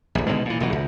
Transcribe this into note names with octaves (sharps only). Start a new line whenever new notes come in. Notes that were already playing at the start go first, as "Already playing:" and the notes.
D#1 A#1
B2 D3 D#3 G#3
A#2 E3
E1 B2 E3 F#3
C#2